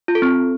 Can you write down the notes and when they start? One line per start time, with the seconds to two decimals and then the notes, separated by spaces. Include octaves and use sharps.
0.08 F4
0.15 A4
0.22 C4